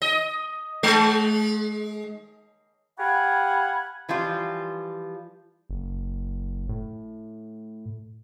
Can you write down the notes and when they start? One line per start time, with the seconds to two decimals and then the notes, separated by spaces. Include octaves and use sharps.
0.02 D#5
0.83 G#3
2.99 G4 F5 F#5 G#5 B5
4.09 E3 F3 G3 F4
5.70 F#1
6.69 A2